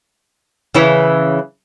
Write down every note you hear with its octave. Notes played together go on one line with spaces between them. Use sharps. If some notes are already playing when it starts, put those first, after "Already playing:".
C#3 E3 E4